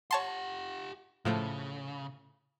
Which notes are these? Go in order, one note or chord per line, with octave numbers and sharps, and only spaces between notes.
G4 C#5 F#5 A5 C6
A2 C#3 F3 A3